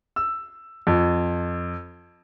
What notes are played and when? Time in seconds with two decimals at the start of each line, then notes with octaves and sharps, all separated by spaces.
0.16 E6
0.87 F2